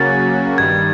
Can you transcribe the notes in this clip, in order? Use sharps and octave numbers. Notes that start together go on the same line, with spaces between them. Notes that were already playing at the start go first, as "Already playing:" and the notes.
Already playing: C#3 F#3 A#3 C#4 F#4 A6
G2 D#3 G3 G#6